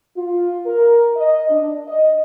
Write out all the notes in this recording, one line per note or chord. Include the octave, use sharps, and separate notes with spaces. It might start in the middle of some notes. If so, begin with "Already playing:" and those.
F4
A#4
D#5
D4
D#5